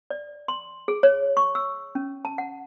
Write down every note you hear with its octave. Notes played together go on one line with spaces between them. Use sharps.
D5
C6
G#4
C#5
C#6
E6
C#4
A5
F#5